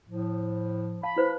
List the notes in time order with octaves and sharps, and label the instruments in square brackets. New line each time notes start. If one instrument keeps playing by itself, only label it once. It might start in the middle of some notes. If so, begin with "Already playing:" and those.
[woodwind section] A2 F3
[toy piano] F5 A5 [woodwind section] B5
[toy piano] E4 B4 C5